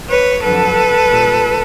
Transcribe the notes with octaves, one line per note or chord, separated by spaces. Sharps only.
B4 C#5
F2 D3 F#3 A4 B4
A#2 G3